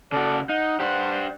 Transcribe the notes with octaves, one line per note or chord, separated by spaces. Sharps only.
C#3 F#4 A4 D5
D#4 F#5
D4 G4 C5 F#5